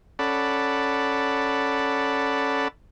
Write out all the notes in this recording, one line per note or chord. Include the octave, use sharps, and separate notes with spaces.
C#4 A4 D5 F#5 A5 B5